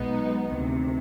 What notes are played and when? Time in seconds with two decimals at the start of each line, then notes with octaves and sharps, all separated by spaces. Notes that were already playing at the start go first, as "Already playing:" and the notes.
Already playing: B1 B2 G#3 B3 D#4
0.50 D2 C3 D#3